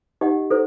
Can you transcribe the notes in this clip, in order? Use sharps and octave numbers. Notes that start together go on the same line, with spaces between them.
D#4 G4 D#5 F#5
E4 A4 C5